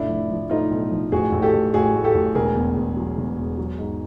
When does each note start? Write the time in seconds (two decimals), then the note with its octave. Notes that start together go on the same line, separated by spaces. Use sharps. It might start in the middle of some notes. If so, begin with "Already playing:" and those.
Already playing: F1 A2 D4 E4
0.09 F3
0.30 F3
0.50 A2 D#4 F4
0.71 B1
0.91 F3
1.12 A1 F#4 G#4
1.32 A1
1.42 G4 A4
1.53 A1
1.74 A1 F#4 G#4
1.94 A2
2.04 G4 A4
2.15 A1
2.35 E1 G#4 A#4
2.55 E2
2.76 E2
2.96 F#3
3.17 E1
3.38 E2
3.57 F#3
3.79 G#2